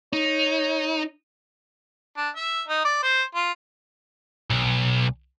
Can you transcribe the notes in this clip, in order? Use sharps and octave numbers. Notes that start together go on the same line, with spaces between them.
D#4 C#5
D4
E5
D#4
D5
C5
F4
B1